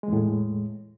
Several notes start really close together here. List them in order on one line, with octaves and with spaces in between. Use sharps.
G#3 E2 A2